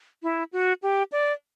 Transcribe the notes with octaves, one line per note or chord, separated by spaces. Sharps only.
E4
F#4
G4
D5